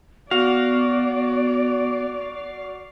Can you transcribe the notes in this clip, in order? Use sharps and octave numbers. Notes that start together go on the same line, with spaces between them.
B3 F#4 D5 F5